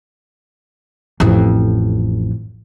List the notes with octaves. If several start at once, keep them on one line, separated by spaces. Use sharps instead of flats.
A1 F2